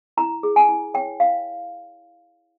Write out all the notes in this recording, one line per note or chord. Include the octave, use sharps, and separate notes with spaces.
E4 A#5
G#4
G#5
E4
C#5 G5
E4 F5